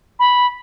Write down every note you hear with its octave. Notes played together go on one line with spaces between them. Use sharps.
B5